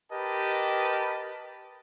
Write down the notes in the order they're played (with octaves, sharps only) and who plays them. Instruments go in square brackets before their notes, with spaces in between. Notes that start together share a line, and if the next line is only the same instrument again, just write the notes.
[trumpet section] G4 A#4 B4 D#5 A5